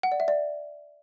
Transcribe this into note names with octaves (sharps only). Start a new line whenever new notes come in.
F#5
D5
E5
D5